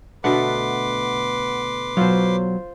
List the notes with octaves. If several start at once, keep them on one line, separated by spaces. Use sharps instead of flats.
B2 D3 A3 B4 F#5 C6 D6
B2 F#3 F4 C5